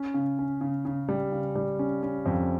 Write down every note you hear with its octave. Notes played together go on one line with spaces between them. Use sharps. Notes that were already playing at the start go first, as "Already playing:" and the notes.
Already playing: C#4
C#3
C#4
C#3
C#3
G3
C#3
G3
C#4
C#4
F2